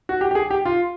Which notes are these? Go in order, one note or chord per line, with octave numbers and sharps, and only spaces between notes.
F#4
G4
G4
G#4
G4
F4